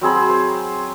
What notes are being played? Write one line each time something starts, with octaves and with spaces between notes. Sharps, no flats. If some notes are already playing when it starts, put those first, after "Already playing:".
F#3 C4 G#4 B5
C5
C5